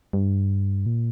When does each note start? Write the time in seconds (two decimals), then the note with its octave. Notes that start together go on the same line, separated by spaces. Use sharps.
0.13 G2
0.86 A#2